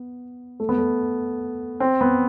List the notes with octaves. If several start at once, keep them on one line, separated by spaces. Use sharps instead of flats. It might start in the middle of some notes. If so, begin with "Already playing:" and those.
Already playing: B3
A3
B3
A3
C4
B3